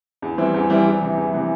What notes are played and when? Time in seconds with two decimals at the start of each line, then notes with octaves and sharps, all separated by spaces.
0.22 E2
0.38 E3 G3 C4 E4
0.54 E2
0.70 E3 G3 C4 E4
0.86 E2
1.01 C3 E3
1.18 E2
1.33 C3 E3